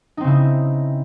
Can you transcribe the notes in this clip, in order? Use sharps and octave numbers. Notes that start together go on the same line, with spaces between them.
C#3 C4 D#4 E4